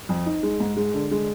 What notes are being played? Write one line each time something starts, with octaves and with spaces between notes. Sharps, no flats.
F2
D#4
G#3
G#2
G#3
D3
G#3